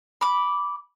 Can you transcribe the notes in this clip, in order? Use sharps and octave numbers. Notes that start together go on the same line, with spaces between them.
B5 D6